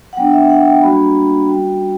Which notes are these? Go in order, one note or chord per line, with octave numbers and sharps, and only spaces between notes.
F#5
F#3 B3 D4 G5
E5
E5
F#5
G5
G3 A#3 D4 F#4 B5
B5
A#5
G3 C#4 F#4 G5